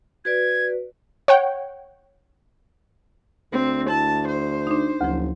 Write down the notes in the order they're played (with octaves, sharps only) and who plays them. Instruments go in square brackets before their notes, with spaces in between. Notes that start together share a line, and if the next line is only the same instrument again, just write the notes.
[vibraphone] F#4 B4 D5 [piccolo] G#6
[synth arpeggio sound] C#5 F#5 G5
[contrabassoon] D2 [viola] C4
[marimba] E4 [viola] A5
[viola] C5
[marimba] D4 D#4
[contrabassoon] F#1 [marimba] D2 F3